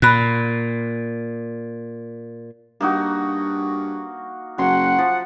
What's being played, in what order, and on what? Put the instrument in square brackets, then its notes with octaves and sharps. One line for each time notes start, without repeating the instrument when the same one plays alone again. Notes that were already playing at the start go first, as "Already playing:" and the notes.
[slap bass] A#2 [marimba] B5 F#6
[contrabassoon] G2 [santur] A#3 D#4 F#4
[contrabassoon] F#1 [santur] F#3 C6 [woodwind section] F#5
[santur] F3